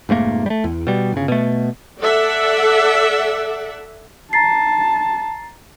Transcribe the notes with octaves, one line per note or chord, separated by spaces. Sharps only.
F1 G#2 A3 A#3
G3 A3
E2
B2 G3
G1 C#3
B2 A3
A4 D5 E5 F#5
A5 A#5 A6 C7